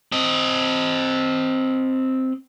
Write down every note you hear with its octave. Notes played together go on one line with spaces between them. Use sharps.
C4 D#5